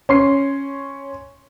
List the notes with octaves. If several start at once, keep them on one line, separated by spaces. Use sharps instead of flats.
C#4 C6 C7